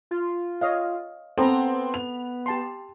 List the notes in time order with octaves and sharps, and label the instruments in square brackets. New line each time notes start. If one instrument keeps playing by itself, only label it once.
[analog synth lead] F4
[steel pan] C#5 D#5 F5
[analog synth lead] B3 [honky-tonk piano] C4 [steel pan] A4 A#5
[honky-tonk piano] F7
[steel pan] G4 A5 C6